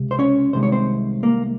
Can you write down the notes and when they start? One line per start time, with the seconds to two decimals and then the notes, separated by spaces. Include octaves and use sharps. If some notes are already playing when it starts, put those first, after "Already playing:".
Already playing: C#2 C3
0.11 C5
0.19 C#4 C#5
0.53 C2 C3 D#3 G#3 C5
0.63 C#5
0.72 C4 C5
1.23 A#3 A#4